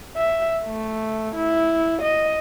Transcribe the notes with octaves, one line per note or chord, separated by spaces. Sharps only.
E5
A3
E4
D#5